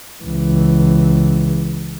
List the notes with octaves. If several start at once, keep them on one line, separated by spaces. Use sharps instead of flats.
C#2 E3